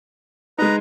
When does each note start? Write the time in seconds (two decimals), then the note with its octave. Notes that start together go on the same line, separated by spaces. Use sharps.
0.58 G#3 D#4 B4 A#5